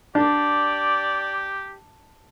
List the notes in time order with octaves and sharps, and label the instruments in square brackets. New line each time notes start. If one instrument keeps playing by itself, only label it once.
[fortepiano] D4 [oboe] G4 [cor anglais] D5